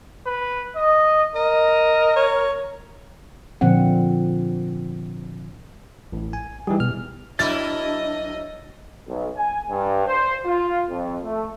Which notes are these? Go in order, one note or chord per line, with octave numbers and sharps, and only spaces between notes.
B4
D#5
A#4 D#5
C#5
A#2 D3 F3 C4 F#5
A1 A2
G#5
E3 G3 D#4 G#4
B2 F6
F#3 D4 E4 A#4 D#5 A6
B1
G#5
G2
C5
F4
F2
A3